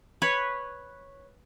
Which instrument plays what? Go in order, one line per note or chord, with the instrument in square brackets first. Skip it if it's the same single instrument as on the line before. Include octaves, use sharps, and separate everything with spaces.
[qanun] B4 C#5